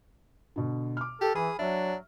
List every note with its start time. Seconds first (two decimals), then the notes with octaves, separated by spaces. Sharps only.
0.56 B2 D3
0.97 D6 F6
1.21 G4 A4
1.35 E3 G#4 B5
1.59 F#3 D4 E5